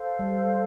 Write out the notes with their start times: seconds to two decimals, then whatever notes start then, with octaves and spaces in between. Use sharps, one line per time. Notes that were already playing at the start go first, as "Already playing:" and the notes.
Already playing: A4 C5 F5
0.19 G3